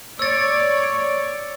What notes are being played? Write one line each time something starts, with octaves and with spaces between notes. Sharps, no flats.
C#5 D5 E6 A6